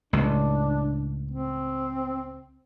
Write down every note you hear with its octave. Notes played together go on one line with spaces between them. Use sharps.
C#2 A2 D4
C4